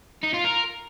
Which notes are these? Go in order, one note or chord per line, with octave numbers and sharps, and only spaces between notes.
D#4
F4
A#4